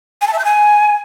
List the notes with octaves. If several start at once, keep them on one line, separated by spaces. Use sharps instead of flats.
G#5
A5
E5
G6
G#5